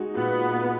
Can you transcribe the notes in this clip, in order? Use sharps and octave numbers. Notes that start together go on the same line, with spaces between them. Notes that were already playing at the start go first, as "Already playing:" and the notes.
Already playing: G#3 D#4 F#4
A#2 B3